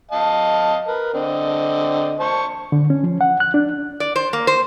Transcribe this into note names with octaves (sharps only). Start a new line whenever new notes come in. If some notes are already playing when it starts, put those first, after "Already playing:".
D#5 F5 A5
A#4 B4
D3 C4 D#5
C5 A5 C#6
D3
C#4
F3
F#5
F#6
D4
D5
C5
A#3
C5